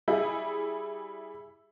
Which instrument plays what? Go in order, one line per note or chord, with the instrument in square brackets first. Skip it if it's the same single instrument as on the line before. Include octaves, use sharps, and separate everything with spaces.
[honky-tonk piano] G3 E4 G#4